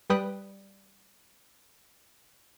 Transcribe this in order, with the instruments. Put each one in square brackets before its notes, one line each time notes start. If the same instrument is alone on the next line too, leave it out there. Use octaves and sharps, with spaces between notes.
[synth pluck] G3 B4 G5 D#6 F#6